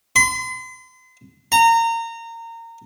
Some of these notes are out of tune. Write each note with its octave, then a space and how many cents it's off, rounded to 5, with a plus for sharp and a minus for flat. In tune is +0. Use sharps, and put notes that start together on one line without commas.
C6 -40
A#5 -25